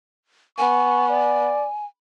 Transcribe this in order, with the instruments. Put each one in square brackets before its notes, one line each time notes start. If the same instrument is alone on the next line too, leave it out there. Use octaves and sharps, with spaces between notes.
[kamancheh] B3 [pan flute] G#5 [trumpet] C#6
[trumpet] D5